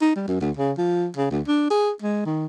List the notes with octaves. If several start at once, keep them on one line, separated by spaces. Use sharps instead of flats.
D#4
G3
F#2
D2
C#3
F3
C#3
D2
D4
G#4
G#3
D#3